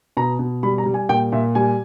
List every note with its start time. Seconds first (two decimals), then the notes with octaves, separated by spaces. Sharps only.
0.17 B2 A#5
0.39 B2
0.63 G3 B5
0.78 A#5
0.86 G3
0.94 G#5
1.09 A#2 G5
1.32 A#2 E5
1.55 G3 G#5